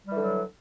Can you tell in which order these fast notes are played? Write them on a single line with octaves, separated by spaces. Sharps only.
G3 E3 D3 F#3